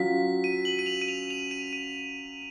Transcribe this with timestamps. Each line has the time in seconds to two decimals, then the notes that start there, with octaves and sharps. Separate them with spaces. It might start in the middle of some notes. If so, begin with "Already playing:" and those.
Already playing: F#3 C#4 F4 B6
0.44 D#7
0.65 F#7
0.79 D#7
0.86 F7
1.01 D#7
1.08 F7
1.30 F7
1.51 D#7
1.73 D#7